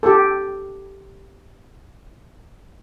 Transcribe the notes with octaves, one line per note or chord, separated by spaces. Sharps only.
G4 A4